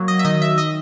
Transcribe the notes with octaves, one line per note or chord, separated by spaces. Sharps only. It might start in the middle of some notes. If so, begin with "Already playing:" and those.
Already playing: F#3 A#3
D#5
E5
D#3 D#5
E5
D#5